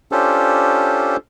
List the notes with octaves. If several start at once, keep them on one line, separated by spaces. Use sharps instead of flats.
C#4 D4 F4 G4 A4 C5